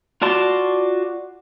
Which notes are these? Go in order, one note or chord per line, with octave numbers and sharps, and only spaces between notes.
F4 F#4 D5 A5 C6